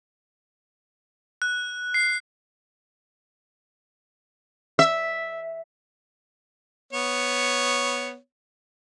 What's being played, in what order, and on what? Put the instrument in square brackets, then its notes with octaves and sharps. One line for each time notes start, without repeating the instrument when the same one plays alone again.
[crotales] F#6
C7
[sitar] E5
[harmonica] B3 C#5